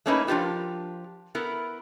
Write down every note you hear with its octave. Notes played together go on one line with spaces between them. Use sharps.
A3 A#3 C#4 D#4 E4 B4
F3 D4 F4 G4 A#4
B3 E4 A#4